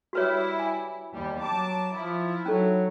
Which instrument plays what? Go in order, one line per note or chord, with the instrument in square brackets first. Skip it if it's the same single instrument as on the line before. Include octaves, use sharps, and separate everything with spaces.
[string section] G3 E4 [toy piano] F#4 B4 C#5
[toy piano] G#5
[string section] D#2 G3
[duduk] F#3 [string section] A5 D6
[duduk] F3 [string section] E4
[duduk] F#3 [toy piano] C#4 D#4 A4